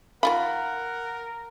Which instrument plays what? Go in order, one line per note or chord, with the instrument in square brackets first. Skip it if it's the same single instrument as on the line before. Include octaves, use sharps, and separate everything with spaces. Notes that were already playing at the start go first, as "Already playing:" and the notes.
[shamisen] D#3 F4 B5 [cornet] A#4 [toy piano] F5 C6 [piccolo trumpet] F#5